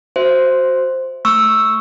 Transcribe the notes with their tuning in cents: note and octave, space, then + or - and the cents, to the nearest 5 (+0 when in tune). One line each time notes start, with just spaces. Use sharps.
F#4 +0 C5 +0 E5 +0
A3 +0 C#6 +0 E6 +0